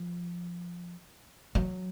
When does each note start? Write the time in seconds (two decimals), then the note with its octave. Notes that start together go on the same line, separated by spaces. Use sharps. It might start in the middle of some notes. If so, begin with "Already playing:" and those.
Already playing: F3
1.55 F#3